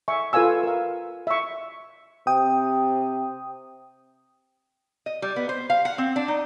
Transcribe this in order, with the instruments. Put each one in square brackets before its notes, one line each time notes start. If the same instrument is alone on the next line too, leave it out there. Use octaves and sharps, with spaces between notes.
[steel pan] E5 G#5 C#6
F4 A4 B4 F5 G#5 E6
A#4 F5
E5 C#6
[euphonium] C3 [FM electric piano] G5 D#6
[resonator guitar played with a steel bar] D#5
G3
B3
C5
F5
F#5
C4
D4
D#4